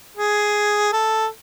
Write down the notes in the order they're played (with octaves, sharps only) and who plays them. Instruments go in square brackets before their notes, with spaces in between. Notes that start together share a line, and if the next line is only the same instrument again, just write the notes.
[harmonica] G#4
A4